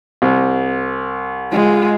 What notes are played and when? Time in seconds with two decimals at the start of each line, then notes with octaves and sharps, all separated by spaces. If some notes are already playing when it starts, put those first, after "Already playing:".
0.22 C2
1.52 G#3 F4